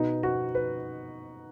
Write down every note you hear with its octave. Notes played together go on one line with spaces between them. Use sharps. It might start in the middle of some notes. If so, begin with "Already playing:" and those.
Already playing: B2 B3 D#4
F#4
B4